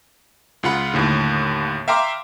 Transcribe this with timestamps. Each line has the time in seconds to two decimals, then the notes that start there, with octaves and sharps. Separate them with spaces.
0.63 C#2 F4 F#5 B5
0.94 D#2 A2 D3
1.88 E5 F5 G5 A#5 C6 D6